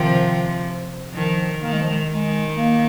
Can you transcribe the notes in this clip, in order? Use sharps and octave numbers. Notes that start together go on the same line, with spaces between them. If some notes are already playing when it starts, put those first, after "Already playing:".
Already playing: C3 D#3 F3
D#3 F3
D#3 A#3
G#3
F3
G#3
D#3 G#3
A#3